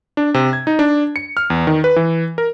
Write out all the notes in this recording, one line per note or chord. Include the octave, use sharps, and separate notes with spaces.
D4
C3
G#6
D#4
D4
C#7
F6
E2
D#3
B4
E3
A#4